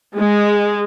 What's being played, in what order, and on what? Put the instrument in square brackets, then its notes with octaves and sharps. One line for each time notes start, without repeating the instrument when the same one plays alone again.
[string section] G#3